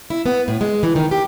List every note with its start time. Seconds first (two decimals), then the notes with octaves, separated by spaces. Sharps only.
0.10 E4
0.26 B3
0.48 A2
0.61 G#3
0.83 E3
0.96 D#3
1.11 G4